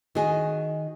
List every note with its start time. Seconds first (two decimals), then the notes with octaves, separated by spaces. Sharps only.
0.15 D#3 F#4 G#4